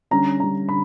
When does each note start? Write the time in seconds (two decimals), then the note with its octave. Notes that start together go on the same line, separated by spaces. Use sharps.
0.11 D3 G3 C#4 A#5
0.40 D3 G3 C#4 A#5
0.69 D3 B5